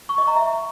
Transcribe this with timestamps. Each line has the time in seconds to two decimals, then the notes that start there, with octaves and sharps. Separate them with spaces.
0.09 C#6
0.18 D#5
0.27 A#5
0.36 E5